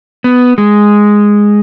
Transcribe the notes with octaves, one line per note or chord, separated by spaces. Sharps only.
B3
G#3